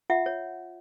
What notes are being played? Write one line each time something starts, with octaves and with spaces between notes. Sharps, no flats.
F4 E5 F#5
C#5